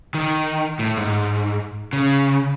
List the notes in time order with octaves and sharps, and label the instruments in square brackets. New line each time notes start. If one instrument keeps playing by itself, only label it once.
[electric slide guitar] D#3
A2
G#2
C#3